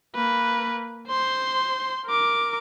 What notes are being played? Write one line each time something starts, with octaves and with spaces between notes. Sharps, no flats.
A#3 B4
C5 C6
A#4 D6